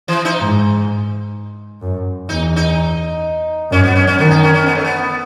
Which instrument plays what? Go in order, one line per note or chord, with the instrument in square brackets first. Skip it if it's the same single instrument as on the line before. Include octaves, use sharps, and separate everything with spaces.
[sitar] E3
D#4
[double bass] G#2
F#2
[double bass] E2 [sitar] D#4
[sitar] D#4
[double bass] F#2 [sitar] C#4
[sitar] B3
C#4
C#4
[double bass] D#3 [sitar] B3
[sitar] D#4
C#4
C#4
B3
A3
B3